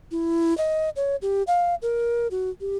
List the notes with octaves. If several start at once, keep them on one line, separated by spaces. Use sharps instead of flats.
E4
D#5
C#5
G4
F5
A#4
F#4
G4